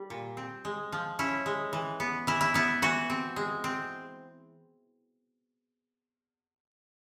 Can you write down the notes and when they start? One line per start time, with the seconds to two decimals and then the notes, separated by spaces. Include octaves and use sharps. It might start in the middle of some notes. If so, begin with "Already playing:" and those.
Already playing: G3
0.10 A#2
0.37 C4
0.65 G#3
0.92 F3
1.19 C#4 E4
1.46 G#3
1.73 E3
2.00 B3
2.27 E3 E4
2.41 E4
2.54 B3 E4
2.82 E3 F#4
3.10 C4
3.36 G#3
3.64 C4